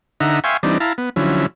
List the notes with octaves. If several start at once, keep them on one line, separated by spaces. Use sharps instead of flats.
D3 D#4 E5 F#5 A#5
E5 F5 G5 G#5 C6 C#6
E3 G3 C4 D4 D#4
E4 F5 A5 A#5
B3
D3 F3 F#3 C#4 E4